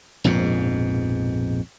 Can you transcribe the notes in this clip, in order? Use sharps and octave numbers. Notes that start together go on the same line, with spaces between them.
A#1 F2 G#2 B2